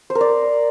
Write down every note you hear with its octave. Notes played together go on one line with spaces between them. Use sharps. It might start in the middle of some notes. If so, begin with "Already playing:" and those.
C5
A#4
D5